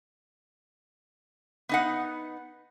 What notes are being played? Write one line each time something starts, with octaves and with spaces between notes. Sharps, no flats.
B3 D#4 F#5